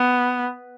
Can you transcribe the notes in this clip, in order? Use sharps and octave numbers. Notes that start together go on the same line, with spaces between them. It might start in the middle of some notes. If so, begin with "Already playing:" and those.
Already playing: B3